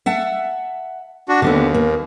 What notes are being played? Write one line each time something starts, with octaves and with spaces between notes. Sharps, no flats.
E5 F#5 A5
D4 F#4
D#2 D3 B3 C4
A#3